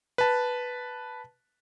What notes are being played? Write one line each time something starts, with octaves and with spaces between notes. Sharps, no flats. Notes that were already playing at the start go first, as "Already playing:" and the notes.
B4 A5